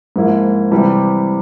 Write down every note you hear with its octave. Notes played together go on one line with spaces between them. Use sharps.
G#2 F3 A#3 E4
C3 E3 G3